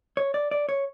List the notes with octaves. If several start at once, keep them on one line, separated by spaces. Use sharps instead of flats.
C#5
D5
D5
C#5